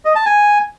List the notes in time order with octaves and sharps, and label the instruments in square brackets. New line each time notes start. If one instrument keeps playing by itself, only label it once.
[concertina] D#5
A5
G#5